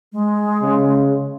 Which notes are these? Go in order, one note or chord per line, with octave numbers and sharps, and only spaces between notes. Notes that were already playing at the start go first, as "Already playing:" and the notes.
G#3
C#3